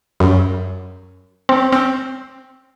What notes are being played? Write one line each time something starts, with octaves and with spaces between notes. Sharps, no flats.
F#2
C4
C4